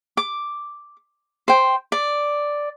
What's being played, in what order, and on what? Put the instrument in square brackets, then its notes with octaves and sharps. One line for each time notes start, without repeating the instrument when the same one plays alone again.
[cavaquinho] D6
C5 G5
D5